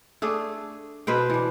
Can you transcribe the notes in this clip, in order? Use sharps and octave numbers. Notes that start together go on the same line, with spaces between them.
A3 D4 G#4
B2 B4 C5 G5
E3 D4